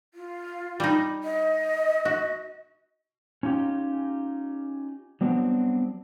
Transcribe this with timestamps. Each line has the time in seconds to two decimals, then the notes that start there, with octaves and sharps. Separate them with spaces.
0.14 F4
0.80 G3 D#4
1.24 D#5
2.05 F#4
3.43 C#4 D#4 F4 G4 G5
5.21 F#3 G3 B3 C4 D4 F#4